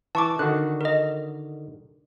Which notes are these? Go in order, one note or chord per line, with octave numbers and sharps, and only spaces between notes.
E3 A5 C#6 D6
D3 D#3 F#4 F#6
A#4 D#5